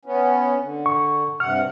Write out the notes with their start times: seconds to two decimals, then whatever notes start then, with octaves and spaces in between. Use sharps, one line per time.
0.05 B3 C#4
0.62 D3
0.86 C#6
1.40 G2 C3 F#5 F6